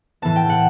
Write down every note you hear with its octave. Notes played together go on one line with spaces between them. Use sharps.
A2 E3 B3 A5
G5
F#5